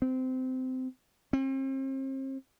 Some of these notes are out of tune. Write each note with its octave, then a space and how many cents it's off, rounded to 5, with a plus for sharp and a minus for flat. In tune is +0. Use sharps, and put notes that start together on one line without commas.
C4 -20
C4 +40